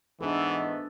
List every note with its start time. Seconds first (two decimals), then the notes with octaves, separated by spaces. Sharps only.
0.21 G#2 E3 A3 B3 D4 F#4 A4